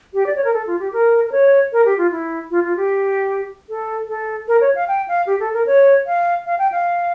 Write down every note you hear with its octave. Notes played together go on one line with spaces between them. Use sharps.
G4
D5
C#5
A#4
A4
F4
G4
A#4
A#4
C#5
A#4
G4
F4
E4
F4
F4
G4
A4
A4
A#4
C#5
F5
G5
F5
G4
A4
A#4
C#5
F5
F5
G5
F5